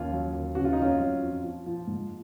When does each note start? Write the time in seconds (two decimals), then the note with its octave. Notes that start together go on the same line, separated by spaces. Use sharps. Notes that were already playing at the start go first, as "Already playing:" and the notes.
Already playing: D#2 C#4 F4
0.12 F#3
0.33 D#2
0.55 C#3 F#4
0.65 F4
0.73 D#4
0.77 F2 C#4 F4
1.00 F#3
1.22 F2
1.43 F3
1.66 F3
1.87 G#2